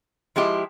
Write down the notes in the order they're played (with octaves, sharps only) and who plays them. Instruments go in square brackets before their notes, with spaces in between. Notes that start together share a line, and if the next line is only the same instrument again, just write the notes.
[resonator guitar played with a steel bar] F3 G#3 E4 G4